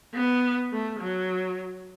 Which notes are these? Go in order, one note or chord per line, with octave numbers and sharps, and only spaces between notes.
B3
A3
F#3